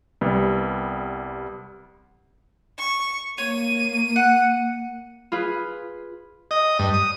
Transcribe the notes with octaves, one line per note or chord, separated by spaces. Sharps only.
C2 G3 B3
C#6
A#3 C#5 D#7
F#5
F4 G#4 B4
D#5
G2
D#6